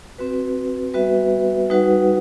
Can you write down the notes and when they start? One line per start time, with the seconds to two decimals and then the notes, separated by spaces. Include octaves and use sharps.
0.18 C4 F#4 B4
0.94 G3 B3 F#4 B4 E5
1.70 G3 D#4 F#4 B4 F#5